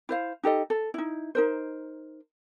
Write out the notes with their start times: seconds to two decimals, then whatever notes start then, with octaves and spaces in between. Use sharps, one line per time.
0.09 E4 C5 F5
0.43 D#4 G4 A4 D#5
0.70 A4
0.94 D#4 E4
1.35 D#4 A#4 C5